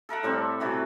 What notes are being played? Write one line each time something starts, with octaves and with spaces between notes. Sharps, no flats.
A4 A#4 E5 F#5
A2 G3 C4 A5
C3 E3 F#4